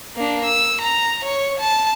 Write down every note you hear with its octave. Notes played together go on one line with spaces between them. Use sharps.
A#3 D4
E6
A#5
C#5
A5